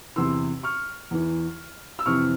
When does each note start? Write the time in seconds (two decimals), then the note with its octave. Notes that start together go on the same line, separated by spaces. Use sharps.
0.16 E2 C3 E3 C6 E6
0.63 C#6 F6
1.11 E2 E3
1.99 E6
2.06 F2 C3 E3 C#6 F6